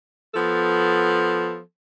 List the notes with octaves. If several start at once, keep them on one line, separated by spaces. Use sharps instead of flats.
F3 B3 A4